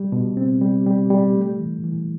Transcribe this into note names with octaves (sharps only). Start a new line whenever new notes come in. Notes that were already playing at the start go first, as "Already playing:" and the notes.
Already playing: G3
B2
C4
G3
G3
G3
A3
E3
E3